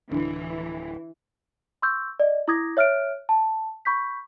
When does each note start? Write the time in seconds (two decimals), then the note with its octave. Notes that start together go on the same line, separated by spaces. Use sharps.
0.11 D1 D3 E3
1.82 C6 C#6 E6 G6
2.20 D5 D#5
2.48 E4 D6 D#6 G#6 A#6
2.77 C#5 E5 F6 F#6 D7
3.29 A5
3.85 B5 C#6 G6 B6